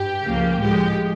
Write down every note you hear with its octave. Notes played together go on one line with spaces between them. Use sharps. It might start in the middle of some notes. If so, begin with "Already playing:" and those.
Already playing: G2 G4
C#2 C#3 F3 A#3
A2 F3 G#3 G4